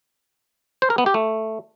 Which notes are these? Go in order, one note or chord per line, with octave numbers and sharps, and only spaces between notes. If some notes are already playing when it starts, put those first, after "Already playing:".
C5
A#4
B3
G4
A3